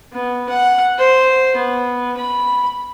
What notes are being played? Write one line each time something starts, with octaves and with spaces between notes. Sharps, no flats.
B3
F#5
C5
B3
B5